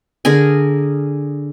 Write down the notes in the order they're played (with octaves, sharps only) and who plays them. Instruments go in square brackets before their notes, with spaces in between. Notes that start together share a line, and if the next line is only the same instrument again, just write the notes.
[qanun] D3 G#4 A#4 G#5